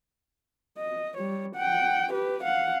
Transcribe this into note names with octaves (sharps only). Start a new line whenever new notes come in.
D#5
G3 C#5
F#5 G5
G4 B4
F5 F#5